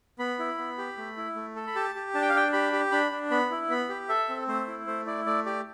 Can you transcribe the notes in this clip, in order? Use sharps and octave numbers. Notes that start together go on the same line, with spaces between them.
B3 B5
E4
B3
G4
A3
E4
A3
A4
B5
G4 A5
G4
D4 A5
G5
F5
D4 G5
G4 B5
G4
D4 B5
D4
B3 B5
E4
B3 B5
G4
A4 E5
C4
A3 C5
E4
A3 C5
E4 D5
A3 D5
G4 D5